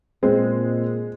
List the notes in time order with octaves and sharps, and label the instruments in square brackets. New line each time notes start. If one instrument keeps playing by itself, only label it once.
[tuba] A#2 [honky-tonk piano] G#3 [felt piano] C4